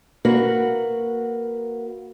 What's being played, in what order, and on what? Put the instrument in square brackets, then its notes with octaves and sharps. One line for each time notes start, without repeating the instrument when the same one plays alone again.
[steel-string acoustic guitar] A#3 F#4 B4 F#5